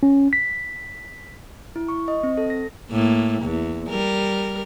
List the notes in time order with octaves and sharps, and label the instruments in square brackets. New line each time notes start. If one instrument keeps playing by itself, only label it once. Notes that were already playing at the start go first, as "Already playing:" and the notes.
[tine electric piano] C#4
B6
[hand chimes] E4
C#6
D#5
C4
A4
A#6
[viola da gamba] A2 A#3
E2
G3 A#4